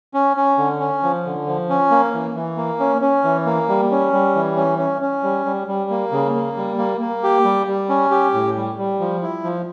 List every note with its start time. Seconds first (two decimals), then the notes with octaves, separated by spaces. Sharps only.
0.14 C#4
0.37 C#4
0.58 D3
0.80 C#4
1.03 F3
1.25 D3
1.47 F3
1.70 C#4
1.91 A#3
2.13 E3
2.35 E3
2.57 A#3
2.80 C#4
3.02 C#4
3.24 E3
3.46 A#3
3.69 G3
3.91 C#4
4.13 G3
4.35 E3
4.56 C#4
4.79 C#4
5.02 C#4
5.23 G3
5.46 G3
5.67 G3
5.90 A#3
6.12 C#3
6.35 A#3
6.57 G3
6.78 A#3
7.01 A#3
7.23 G4
7.45 G3
7.67 G3
7.89 C#4
8.11 G4
8.34 A2
8.56 G3
8.78 G3
9.00 F3
9.23 E4
9.44 F3